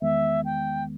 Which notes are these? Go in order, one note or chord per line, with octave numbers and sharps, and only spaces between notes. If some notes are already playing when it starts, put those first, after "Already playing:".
E2 D#3 G#3 B3 E5
G5